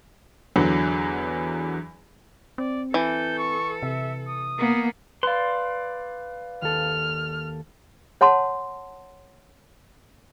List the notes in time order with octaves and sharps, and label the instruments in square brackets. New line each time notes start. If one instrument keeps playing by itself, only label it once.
[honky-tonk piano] E2 D3 E3 F#3
[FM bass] C4 [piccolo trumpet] D5
[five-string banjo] E3 [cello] A4 [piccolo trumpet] G6
[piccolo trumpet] C#6
[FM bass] C3 [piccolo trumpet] E5
[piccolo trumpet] D#6
[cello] A#3 B3
[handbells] B4 F5 [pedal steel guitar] D5 C6
[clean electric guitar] D#2 A4 [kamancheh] F6
[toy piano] C#5 F#5 A5 C6